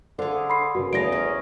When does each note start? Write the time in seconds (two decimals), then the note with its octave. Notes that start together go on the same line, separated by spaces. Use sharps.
0.19 D3 G#4 C5 F5
0.50 B5 C6 C7
0.75 C#3 F#4 A#4 B4
0.93 E2 A3 E4 C#5 D#5 F5 A#6 D7
1.12 C#4 C5